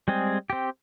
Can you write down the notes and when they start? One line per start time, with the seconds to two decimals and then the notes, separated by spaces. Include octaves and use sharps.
0.08 G3 G#3 C4 G#4
0.50 C4 G4